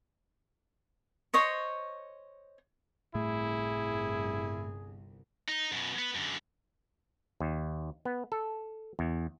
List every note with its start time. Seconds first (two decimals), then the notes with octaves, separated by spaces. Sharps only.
1.34 C5 C#5 D#5 C#6
3.15 G1 C2 A2 A3 E4 G#4
5.48 D#4
5.72 F#2 B2
5.98 B3 B4
6.15 F#2 D3
7.40 D#2
8.05 B3
8.32 A4
8.99 E2